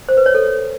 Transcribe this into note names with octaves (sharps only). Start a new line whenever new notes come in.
C5
B4
C#5
A4